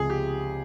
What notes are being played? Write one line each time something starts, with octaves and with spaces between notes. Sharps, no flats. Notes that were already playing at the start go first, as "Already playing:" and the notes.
Already playing: C#2 C3 F3 G#4
G4